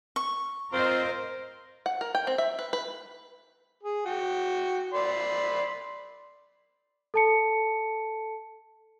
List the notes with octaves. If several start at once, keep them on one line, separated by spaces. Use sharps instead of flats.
C#6
C4 F4 A#4 C5 D#5
F#5
A#4
G5
C4
E5
B4
B4
G#4
F#4 G5
D5 B5 C6
A4 A5 C#7